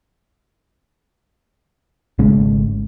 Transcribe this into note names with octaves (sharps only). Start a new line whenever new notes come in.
G#1 C#3 G#3 A3